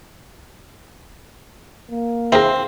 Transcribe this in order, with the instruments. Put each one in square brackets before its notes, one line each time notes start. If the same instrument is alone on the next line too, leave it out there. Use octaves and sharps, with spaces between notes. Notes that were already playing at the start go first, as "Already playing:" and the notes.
[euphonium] A#3
[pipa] C4 [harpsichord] E4 G#4 A#4